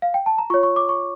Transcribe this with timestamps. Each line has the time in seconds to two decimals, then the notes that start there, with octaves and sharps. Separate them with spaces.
0.02 F5
0.14 G5
0.26 A5
0.38 A#5
0.50 F4 C#6
0.54 C#5
0.63 C#6
0.76 D6
0.89 C#6